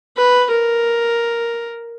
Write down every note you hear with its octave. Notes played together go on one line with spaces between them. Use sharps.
B4
A#4